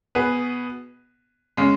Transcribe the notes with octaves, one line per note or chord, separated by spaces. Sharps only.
B2 B3 G#4 B4
C#3 G#3